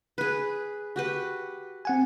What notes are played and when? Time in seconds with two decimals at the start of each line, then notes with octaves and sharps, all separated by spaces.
0.18 G#4 B4
0.96 F#4 G4 B4
1.85 C4 F#5 G#5